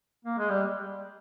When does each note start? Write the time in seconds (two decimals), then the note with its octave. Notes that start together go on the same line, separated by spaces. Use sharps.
0.25 A#3
0.38 G#3
0.50 G3